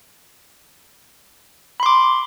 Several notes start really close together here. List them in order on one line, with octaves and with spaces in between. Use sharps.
B5 C6 D6